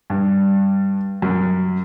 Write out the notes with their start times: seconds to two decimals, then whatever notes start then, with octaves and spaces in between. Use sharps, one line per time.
0.10 G2
1.22 F#2